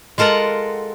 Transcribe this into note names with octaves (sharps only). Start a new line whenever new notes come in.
G#3 F4 A4 A#4 F#5